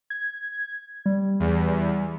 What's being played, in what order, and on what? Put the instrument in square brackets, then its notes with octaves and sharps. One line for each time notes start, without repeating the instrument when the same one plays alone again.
[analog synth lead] G#6
G3
[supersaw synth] E2